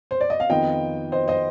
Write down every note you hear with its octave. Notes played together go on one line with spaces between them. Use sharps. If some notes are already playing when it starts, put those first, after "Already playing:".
C5
D5
D#5
F5
F2 D#3 B3 F4 D#5 G5
C5 D#5
C5 D#5